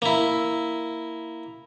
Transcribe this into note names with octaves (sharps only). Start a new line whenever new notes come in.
A#3 E4